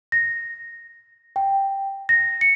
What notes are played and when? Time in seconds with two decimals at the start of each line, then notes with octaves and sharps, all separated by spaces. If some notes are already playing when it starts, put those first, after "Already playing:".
0.12 A#6
1.36 G5
2.09 A#6
2.41 C#7